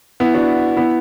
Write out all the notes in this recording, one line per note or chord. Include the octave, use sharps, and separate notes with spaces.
B3 E4
D4 F#4
B3 E4